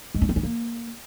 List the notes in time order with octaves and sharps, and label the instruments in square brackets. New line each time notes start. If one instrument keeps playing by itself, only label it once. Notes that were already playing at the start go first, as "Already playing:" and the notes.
[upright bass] G#3
C#4
C4
C#4
A#3